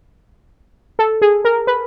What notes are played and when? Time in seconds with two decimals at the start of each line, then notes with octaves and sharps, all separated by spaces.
0.99 A4
1.22 G#4
1.45 A#4
1.67 B4